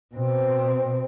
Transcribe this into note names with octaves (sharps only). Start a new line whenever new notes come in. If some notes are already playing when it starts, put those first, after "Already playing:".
B2 C4